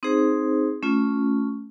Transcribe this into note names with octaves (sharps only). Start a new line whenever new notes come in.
C4 D#4 G#4 C5
A3 C#4 F4